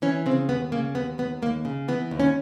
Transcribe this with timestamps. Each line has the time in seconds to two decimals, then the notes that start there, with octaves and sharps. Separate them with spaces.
0.02 E3 C#4
0.26 C#3 C4
0.49 D#2 B3
0.72 C#3 A#3
0.95 D#2 B3
1.18 D#2 B3
1.42 D#2 A#3
1.65 C#3
1.88 E3 B3
2.11 D#2
2.20 C#4